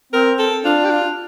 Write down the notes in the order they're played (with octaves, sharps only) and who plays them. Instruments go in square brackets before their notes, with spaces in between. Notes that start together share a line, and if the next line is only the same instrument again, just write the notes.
[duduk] C4 [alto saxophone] A#4
[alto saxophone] A4
[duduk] D4 [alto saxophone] F4
[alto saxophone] G4
F4